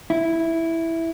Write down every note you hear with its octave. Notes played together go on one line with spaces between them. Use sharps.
E4